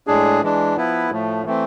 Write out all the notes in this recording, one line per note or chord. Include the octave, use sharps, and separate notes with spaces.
A2 G#3 D4 G#4
E3 G#3 D4
F3 B3 E4 B4
A2 F3 A3
E3 A3 C4